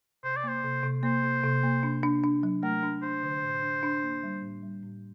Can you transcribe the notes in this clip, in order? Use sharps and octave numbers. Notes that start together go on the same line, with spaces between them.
C3 C5
D5
A#3 C5
C3
C3
A#3 C5
C3
C3
A#3
D4
D4
D4
F#3
A3 A#4
D4
D4 C5
D3
A2
D4
D4
A#3
G3
A2
G3
A2